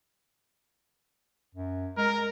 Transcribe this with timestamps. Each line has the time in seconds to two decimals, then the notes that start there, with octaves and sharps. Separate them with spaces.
1.55 F#2
1.97 G#3 A#4